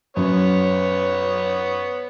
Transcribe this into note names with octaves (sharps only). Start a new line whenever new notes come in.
F#2 B3 C#5